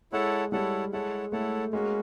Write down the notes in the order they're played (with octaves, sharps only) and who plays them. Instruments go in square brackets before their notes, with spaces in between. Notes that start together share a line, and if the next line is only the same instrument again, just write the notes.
[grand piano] G#3 [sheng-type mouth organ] E4 A4 C#5 F#5 A5
[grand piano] G3 [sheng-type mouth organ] E4 A4 C#5 F#5 A5
[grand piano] G#3 [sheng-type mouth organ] E4 A4 C#5 F#5 A5
[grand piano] A3 [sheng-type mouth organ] E4 A4 C#5 F#5 A5
[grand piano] G#3 [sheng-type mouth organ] A#3 C#4 F#4